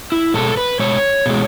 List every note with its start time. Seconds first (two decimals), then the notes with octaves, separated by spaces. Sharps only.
0.12 E4
0.34 B2 G#3 A4
0.57 B4
0.79 B2 G#3 C#5
1.26 B2 G#3